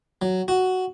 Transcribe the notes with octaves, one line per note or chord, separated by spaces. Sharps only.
F#3
F#4